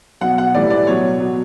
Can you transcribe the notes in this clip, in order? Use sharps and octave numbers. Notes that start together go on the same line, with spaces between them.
B2 F#3 F#5
F#5
A2 E3 G3 D5
D5
B2 F#3 C#5
B2 F#3